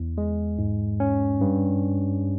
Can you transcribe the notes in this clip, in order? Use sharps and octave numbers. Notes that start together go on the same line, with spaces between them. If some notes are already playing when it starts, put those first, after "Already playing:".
Already playing: E2
G#3
G#2
C#4
G2